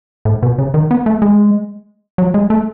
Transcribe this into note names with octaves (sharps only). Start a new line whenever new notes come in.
A2
B2
C#3
D#3
B3
A3
G#3
F#3
G#3
A3